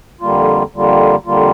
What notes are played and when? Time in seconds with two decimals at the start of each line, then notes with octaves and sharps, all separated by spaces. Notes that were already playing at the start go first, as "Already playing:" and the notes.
0.21 F2 D3 G3 A#3 F4
0.74 F2 D3 G3 A#3 F4
1.26 F2 D3 G3 A#3 F4